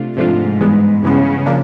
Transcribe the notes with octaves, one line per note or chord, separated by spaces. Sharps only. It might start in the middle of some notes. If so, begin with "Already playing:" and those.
Already playing: C3 A3 D4 F4
G#2 C3 F3 A3 D4 F4
G2 E3 G#3 B3
G2 C#3 E3 G#3 B3
F3 A#3 D4